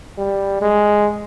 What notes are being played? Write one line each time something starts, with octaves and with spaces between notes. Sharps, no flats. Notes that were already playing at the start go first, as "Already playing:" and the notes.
G3
G#3